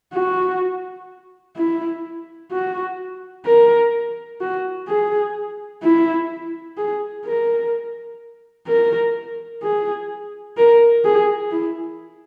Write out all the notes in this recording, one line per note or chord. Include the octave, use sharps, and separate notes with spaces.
F#4
E4
F#4
A#4
F#4
G#4
E4
G#4
A#4
A#4
G#4
A#4
G#4
E4